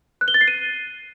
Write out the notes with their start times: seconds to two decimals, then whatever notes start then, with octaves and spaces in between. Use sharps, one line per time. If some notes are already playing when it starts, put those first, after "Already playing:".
0.21 F#6
0.28 G7
0.34 A6
0.41 C7
0.48 D#7